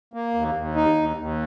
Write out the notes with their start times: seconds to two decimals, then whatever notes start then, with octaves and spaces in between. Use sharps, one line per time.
0.14 A#3
0.34 D#2
0.55 D#2
0.75 D#4
0.96 D#2
1.17 D#2